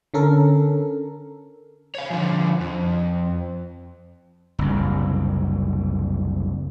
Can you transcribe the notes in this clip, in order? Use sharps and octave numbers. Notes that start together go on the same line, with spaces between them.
D3 C#4 A4 A#4
C#5 F5
D3 F3
F2
F#1 C2